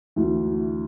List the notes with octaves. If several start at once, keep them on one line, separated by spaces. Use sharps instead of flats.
D2 E3